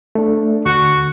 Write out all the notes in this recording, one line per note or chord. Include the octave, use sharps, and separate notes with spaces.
A3 D4
D2 F#4